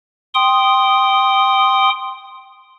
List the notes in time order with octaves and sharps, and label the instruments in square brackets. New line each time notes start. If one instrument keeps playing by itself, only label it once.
[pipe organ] G5 C6 D#6